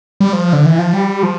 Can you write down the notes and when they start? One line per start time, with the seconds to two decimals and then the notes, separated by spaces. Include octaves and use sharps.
0.20 G3
0.33 F3
0.53 D3
0.66 E3
0.79 F3
0.93 G3
1.23 F3